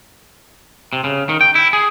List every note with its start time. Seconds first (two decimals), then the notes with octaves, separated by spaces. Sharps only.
0.93 C3
1.04 C#3
1.29 D#3
1.41 G5
1.55 E4
1.73 G#4